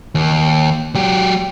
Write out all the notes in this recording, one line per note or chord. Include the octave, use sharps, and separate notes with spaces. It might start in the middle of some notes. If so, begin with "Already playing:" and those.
D#2
F#3 G4